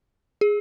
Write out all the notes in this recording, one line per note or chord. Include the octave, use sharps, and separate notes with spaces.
G#4